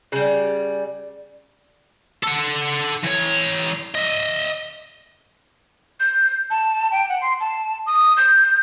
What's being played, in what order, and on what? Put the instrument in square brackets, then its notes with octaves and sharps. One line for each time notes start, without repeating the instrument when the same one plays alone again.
[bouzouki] C#3 G3
[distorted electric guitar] A4 F#5
E3 C#5
D#5 E5
[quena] G6
A5
G5
F#5
C6
A5
D#6
G6